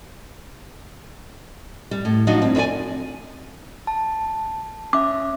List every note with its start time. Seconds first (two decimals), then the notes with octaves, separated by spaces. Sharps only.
1.91 G3
2.05 A2
2.27 F3 F#3 D4 D#4 F#4
2.42 G2 C4
2.55 C4 B4 C5 D5 G#5
3.87 A5
4.93 C#4 E5 D6